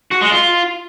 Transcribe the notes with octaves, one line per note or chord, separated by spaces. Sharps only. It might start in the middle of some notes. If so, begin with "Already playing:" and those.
F#4
G#3
F4